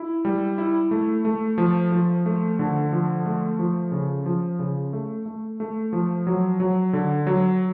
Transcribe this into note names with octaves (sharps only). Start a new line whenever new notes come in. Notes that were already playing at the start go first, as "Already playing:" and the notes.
Already playing: E4
G3
E4
A3
A3
F3
F3
A3
D3
F3
A3
F3
C#3
F3
C#3
A3
A3
A3
F3
F#3
F#3
D3
F#3